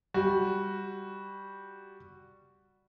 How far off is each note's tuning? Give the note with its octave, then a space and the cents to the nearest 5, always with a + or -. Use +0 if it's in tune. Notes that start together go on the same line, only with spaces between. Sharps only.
G3 +0 F#4 +0